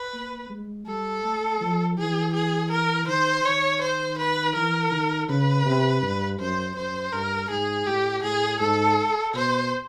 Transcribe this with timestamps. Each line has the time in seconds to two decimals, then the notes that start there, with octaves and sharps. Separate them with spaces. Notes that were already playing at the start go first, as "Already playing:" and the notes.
Already playing: B4
0.14 A#3
0.50 G#3
0.87 G3 A4
1.24 A3
1.61 F3
1.98 E3 G#4
2.34 G#4
2.71 A#4
3.08 D#3 C5
3.44 D#3 C#5
3.81 C5
4.18 B4
4.55 E3 A#4
4.91 D#3
5.29 C#3 B4
5.66 C3
6.02 G2
6.39 F#2 C5
6.75 F#2 C5
7.12 G2 A#4
7.50 G#2 G#4
7.86 A2 G4
8.23 A2 G#4
8.60 G#2 A4
9.34 B2 C5